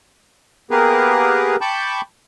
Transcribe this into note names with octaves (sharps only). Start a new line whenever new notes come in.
A#3 B3 G4 G#4 A#4 B4
G5 A5 B5 C#6 D6 G6